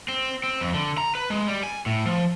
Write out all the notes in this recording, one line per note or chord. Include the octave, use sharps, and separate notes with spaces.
C4
C4
F2
D3
A#5
B4
G#3
G3
G#5
A2
F3